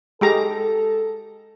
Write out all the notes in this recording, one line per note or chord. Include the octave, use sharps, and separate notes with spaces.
G#3 G4 A4 A#5